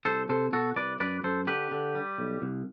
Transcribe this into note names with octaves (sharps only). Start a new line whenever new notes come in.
C2 A4 C5
C3 A4 C5
B2 F#4 A4
C2 B4 D5
F#2 B4 D5
F#2 A4 C5
D3 G4 B4
D3
G3
B1
C2